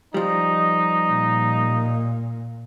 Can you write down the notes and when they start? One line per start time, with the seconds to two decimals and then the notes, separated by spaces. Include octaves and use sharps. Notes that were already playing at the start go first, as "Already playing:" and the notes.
0.14 F3 G3 D#4
1.08 A#2